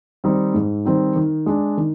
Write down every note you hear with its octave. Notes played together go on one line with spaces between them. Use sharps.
D#3 G3 C4 D#4
G#2
D#3 G3 C4 D#4
D#3
G#3 D4
D#3